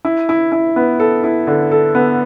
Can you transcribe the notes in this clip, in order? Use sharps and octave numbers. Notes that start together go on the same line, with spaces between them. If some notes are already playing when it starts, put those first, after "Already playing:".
E4
E4
E4
B3
A4
E4
D3
A4
B3